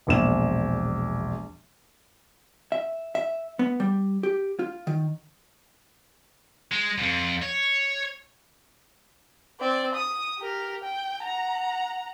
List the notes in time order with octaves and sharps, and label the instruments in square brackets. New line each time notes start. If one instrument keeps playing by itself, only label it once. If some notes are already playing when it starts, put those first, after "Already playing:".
[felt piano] E1 A#1 E7
[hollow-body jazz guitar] E5
E5
B3
G3
G4
F4
D#3
[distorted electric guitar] G#3
F2 G#2
C#5
[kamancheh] C4 D5
D#6
G4 A#4
G5
F#5 A#5